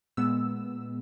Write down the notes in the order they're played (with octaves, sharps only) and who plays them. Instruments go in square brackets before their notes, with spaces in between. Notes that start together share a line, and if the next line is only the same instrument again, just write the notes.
[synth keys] A#2 G#3 B3 E6